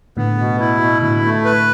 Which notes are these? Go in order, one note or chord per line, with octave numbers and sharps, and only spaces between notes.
A2 D3 B3
B2
E4
B2
A2 D3 E4
A3
B4